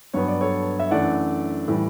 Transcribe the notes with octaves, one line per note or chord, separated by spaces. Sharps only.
G2 F#3 B3 C#5
D5
A4 C#5
E5
F#2 E3 A3 D4 D5 F#5
A2 E3 G3